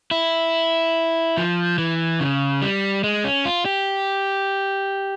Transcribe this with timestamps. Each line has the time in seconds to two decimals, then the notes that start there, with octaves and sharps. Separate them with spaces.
0.11 E4
1.37 F3
1.78 E3
2.20 C#3
2.62 G3
3.04 G#3
3.24 C#4
3.45 F4
3.66 G4